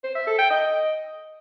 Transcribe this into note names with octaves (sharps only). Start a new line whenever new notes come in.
C5
E5
A4
G5
D#5